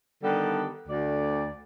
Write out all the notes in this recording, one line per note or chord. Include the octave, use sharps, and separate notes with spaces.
D3 D#3 G3 B3 G4 A4
D2 D5